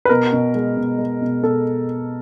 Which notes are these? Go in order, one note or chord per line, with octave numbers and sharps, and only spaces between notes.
B4
B2 A#4
B2
G#3
B2
G#3
B2
B2 A4